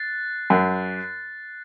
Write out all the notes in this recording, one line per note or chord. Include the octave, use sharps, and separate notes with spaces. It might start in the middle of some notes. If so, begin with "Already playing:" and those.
Already playing: F#6 A6 C7
F#2